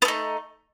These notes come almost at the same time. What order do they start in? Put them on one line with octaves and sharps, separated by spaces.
B3 A3 D#4